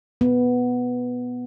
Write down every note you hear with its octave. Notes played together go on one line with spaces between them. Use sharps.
B3